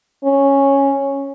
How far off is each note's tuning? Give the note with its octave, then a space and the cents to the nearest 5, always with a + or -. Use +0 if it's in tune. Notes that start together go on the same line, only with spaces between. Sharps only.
C#4 -5